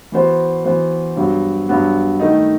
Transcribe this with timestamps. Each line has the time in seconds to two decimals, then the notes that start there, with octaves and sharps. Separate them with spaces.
0.12 E3 B3 F#4 C5
0.64 E3 B3 F#4 C5
1.16 G2 F#3 B3 F#4
1.68 G2 F#3 B3 F#4
2.20 D#3 A3 D#4